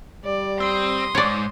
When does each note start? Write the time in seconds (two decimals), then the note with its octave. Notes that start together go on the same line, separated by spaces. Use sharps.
0.25 G3 D5
0.60 C4 C6 D#6
1.15 D2 G#2 C#5 D5